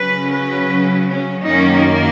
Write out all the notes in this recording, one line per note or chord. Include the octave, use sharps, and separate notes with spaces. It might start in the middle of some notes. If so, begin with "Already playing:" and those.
Already playing: C#3 F#3 C#4 B4
B4
C#4
F#2 D#3 A#3 C#4 D#4